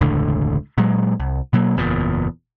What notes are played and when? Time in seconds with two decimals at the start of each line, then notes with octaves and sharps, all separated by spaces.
0.01 E1 C#2 A2 D3
0.78 A#2 F#3 G#3
1.20 C2
1.53 B2 F#3 A#3
1.77 F#1 E2 A#2